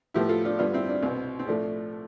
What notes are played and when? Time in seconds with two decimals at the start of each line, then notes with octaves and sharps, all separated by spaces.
0.14 A2 F3 B3 E4 G4
0.29 F4 A4
0.45 D4 F4
0.58 G2 D3 G3 B3 D4 F4
0.73 C4 E4
0.89 D4
1.03 C2 B2 B3 C4
1.39 C4
1.47 A2 F3 A3 D4